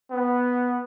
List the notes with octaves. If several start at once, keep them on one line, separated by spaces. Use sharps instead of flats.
B3